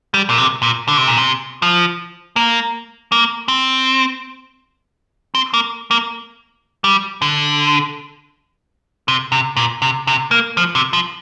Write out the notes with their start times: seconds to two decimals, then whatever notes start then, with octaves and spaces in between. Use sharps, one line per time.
0.14 G3
0.30 A#2
0.38 C3
0.63 A#2
0.88 D3
0.97 C3
1.08 A#2
1.17 C3
1.62 F3
2.36 A#3
3.12 A#3
3.48 C4
5.35 C4
5.54 A#3
5.91 A#3
6.84 G3
7.22 D3
9.08 C3
9.32 C3
9.57 A#2
9.82 C3
10.07 C3
10.31 A#3
10.57 F3
10.75 C3
10.93 F3